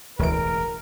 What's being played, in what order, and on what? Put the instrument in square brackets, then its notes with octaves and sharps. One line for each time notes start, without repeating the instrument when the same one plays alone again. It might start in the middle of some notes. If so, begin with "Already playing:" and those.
[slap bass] E1 A1 [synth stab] D2 E3 D7 [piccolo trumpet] A#4